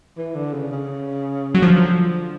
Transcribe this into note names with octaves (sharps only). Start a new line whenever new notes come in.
E3
D3
C#3
C#3
F#3
D3 F3